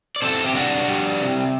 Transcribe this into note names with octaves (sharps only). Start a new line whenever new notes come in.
D5
C3 A4 C5
G4
G3 D4 F#4
G3
C3